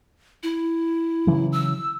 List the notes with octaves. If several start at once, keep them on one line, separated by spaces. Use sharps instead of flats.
E4
C#3 E3 F#3
E6